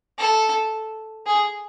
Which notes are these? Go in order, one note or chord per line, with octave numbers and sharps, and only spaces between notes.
A4
G#4